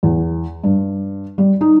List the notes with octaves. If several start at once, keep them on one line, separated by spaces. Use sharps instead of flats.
E2
G2
G3
D#4